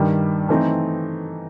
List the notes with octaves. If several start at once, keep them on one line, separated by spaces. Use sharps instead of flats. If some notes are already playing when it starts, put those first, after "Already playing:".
Already playing: G2 D#3 G3
E3 A3 C4 D#4 A4